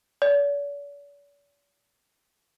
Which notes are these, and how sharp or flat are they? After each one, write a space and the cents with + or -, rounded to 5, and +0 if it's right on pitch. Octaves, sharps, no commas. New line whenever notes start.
D5 -45